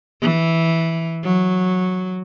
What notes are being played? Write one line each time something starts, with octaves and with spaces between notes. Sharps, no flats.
E3
F#3